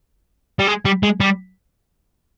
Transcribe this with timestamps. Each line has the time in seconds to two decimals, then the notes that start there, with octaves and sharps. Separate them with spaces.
0.59 G3
0.67 G#3
0.85 G3
1.03 G#3
1.20 G3